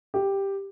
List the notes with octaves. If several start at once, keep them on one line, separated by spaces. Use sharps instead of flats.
G4